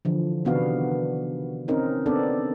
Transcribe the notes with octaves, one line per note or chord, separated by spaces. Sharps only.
D3 E3 F3
C3 D#3 B3 D4 F#4 F5
C4 C#4 D#4 A#4
B3 C4 D4 A4 D5